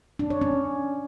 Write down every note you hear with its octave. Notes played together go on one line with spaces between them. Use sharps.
D4
C#5
C#4